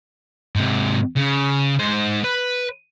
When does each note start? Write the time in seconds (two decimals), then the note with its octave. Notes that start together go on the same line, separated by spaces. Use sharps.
0.56 G#2 C3
1.17 C#3
1.79 G#2 C5
2.24 B4